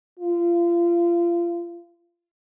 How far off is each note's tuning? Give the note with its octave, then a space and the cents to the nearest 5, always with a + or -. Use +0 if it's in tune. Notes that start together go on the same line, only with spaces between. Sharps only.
F4 -30